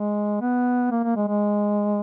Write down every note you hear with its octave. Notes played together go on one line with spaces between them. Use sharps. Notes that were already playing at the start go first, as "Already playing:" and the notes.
Already playing: G#3
B3
A#3
A#3
G#3
G#3